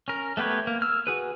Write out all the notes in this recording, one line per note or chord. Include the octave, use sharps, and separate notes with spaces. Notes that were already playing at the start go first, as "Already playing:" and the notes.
C#4 A#4
A3 B3 G4 B4 C#5
A#3
E6 F6
F#4 G#4 B4